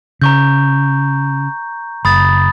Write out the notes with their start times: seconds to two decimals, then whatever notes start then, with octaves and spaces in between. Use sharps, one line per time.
0.22 C#3 A#5 C#6 G6
2.05 F#1 B5 D#6 A6